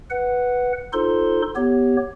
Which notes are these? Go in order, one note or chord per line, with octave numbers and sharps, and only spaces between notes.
B4 F#5
D#4 F4 A4 C5 C6
B3 G4 C#5